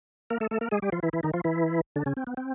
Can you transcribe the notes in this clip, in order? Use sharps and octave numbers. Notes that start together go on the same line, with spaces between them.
A#3 A#4
A3 A4
A3 A4
A#3 A#4
G#3 G#4
G3 G4
F3 F4
E3 E4
E3 E4
D#3 D#4
F3 F4
E3 E4
D3 D4
C#3 C#4
C4
B3
C4